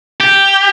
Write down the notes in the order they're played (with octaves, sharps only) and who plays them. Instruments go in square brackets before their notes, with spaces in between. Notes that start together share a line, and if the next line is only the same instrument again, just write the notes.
[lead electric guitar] G4